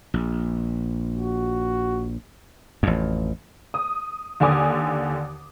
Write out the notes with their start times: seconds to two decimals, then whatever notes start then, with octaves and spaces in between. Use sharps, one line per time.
0.14 A#1
1.16 F#4
2.83 A1 F2
3.74 D#6
4.40 D#2 D3 G#5 D6 D#6